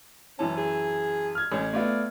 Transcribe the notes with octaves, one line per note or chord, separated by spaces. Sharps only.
F#2 E3 C#4 A5
G#4
F6 G#6
A1 C#4
A3 B3 F4 D5